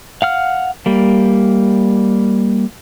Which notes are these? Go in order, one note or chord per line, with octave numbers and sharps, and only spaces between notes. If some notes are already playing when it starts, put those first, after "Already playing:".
F5 F#5 F6
G3 A#3